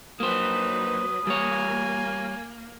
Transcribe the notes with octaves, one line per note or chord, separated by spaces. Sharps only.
F#3 A#3 D#4 B4 C5 D#6
G3 A#3 C#5 G#5